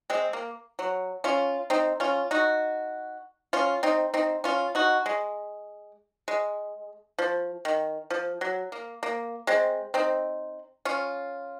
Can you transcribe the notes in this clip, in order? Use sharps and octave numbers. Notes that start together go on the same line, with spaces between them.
G#3 C4
A#3
F#3
C#4 F4
C4 D#4
C#4 F4
D#4 F#4
C#4 F4
C4 D#4
C4 D#4
C#4 F4
D#4 F#4
G#3
G#3
F3
D#3
F3
F#3
A#3
A#3
G#3 C4
C4 D#4
C#4 F4